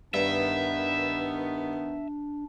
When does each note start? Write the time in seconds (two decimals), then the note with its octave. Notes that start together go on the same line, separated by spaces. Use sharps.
0.14 G2 D#3 B3 D4 E5